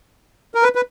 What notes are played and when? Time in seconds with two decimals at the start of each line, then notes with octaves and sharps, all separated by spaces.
0.55 A#4
0.63 B4
0.75 B4